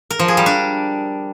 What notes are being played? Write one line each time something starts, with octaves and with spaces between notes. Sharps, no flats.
A#4
F3
G#4
G3
D4